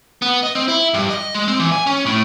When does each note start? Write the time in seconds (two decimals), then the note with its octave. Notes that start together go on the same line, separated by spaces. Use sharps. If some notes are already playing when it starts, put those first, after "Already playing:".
0.22 B3
0.43 D#5
0.55 C4
0.68 E4
0.94 G2
1.09 D#5
1.34 G#3
1.48 C4
1.60 E3
1.72 G#5
1.87 C#4
2.06 A2